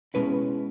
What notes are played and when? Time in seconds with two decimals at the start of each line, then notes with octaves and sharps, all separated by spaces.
0.14 B2 G#3 C#4 E4 B4